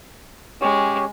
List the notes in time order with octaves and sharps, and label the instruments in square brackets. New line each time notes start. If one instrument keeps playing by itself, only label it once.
[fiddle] G#3 [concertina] C#4 G4 C#5